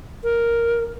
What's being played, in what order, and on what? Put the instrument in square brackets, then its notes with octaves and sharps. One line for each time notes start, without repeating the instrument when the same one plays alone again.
[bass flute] A#4